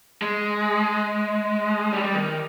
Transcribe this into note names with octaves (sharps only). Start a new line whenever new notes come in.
G#3
G3
D#3